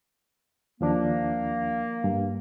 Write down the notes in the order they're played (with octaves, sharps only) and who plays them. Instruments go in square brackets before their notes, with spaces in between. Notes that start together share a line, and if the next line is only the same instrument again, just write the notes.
[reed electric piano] D#2 F3 D4 [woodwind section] A#3
[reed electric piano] G2